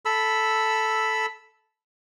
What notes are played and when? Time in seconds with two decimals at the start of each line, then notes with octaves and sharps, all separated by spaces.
0.05 A4 B5 E6